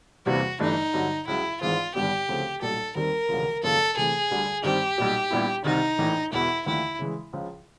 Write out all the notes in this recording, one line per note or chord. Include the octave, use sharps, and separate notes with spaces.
E2 C3 E3 G3 A#3 F#4
G1 G2 E3 A3 D4 D#4
G2 D3 F#3
C#2 C#3 F#3 E4
G#1 G#2 E3 G#3 C4 F4
G#1 G2 D3 G3 B3 G4
D2 C#3 F3 A3 C4
B1 A#2 G3 A4
D#2 D#3 G3 C4 A#4
E1 D2 C#3 F3
G#1 F#2 C#3 F3 A#3 A4
C3 E3 A3 G#4
D2 D3 G3
G2 D#3 G3 C4 G4
B1 A#2 G3
A#1 A#2 G3 B3 E4
C2 C3 D#3 D#4
A#1 A2 E3
E1 E2 B2 E4
D#2 D3 F3 A3 E4
C#3 E3 G#3
C#2 C#3 F3